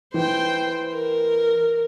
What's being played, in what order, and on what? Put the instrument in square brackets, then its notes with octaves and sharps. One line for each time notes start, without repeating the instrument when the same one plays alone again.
[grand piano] E3 [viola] C5 G5
[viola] A#4